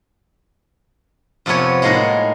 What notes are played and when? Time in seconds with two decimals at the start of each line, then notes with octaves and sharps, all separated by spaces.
1.46 F2 C3 F3 B3 C#5
1.82 A2 G#3 A#3 D#4 A#4 F#5